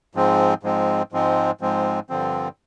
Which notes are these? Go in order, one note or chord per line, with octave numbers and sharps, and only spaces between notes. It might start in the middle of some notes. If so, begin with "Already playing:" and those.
G#2 F3 G#3 C4
G#2 F3 G#3 C4
G#2 F3 G#3 C4
G#2 F3 G#3 C4
G2 D3 F3 C4